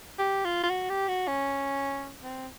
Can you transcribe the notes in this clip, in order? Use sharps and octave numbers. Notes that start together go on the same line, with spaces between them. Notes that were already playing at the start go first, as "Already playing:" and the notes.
G4
F4
F4
F#4
G4
F#4
C#4
C4